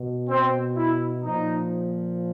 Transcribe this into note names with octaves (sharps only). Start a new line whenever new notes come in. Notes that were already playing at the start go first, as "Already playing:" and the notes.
Already playing: B2
C4
E4
A#2 F3 D#4